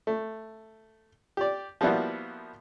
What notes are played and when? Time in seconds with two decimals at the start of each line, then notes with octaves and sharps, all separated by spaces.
0.07 A3
1.37 G4 D5
1.81 F3 G3 A#3 B3 E4 F#4